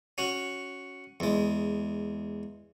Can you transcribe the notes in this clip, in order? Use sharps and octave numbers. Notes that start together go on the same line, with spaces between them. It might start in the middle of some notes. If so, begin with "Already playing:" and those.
C#4 F#4
E2 G#3